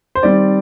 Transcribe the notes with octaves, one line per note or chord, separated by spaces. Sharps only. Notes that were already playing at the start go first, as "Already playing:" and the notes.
C5
D#3 G3 C4 D5